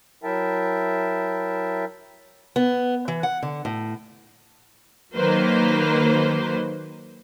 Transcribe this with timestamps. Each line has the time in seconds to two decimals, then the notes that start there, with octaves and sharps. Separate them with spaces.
0.23 F#3 E4 A#4 E5 G5 A5
2.56 B3
3.08 E3
3.23 F#5
3.42 D3
3.65 A2
5.14 D#3 F#3 A#3 B4 C5